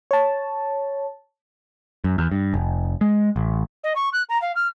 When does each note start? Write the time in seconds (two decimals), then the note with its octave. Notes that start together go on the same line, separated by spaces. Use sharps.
0.11 C#5 A5
2.04 F#2
2.18 E2
2.32 G2
2.54 F1
3.01 G#3
3.36 A1
3.84 D#5
3.95 C#6
4.13 F#6
4.29 A#5
4.41 F5
4.55 F6